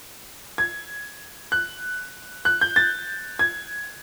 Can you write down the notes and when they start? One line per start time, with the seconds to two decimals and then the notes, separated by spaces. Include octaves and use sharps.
0.58 G#6
1.52 F#6
2.45 F#6
2.61 G6
2.76 A6
3.39 G#6